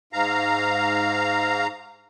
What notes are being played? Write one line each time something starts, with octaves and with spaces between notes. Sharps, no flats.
G#2 F5 A#5